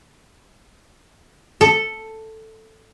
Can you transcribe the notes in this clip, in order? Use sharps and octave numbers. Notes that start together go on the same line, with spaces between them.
A4